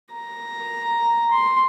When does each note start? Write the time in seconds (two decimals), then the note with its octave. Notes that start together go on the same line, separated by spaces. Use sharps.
0.13 A#5
1.31 C6